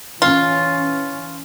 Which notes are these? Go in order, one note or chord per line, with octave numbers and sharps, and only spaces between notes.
E3 C#4 F4